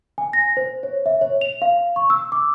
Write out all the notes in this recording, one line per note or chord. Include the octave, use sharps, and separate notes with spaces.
G#5
A#6
C5
C#5
E5
C#5
F7
F5
C#6
E6
D6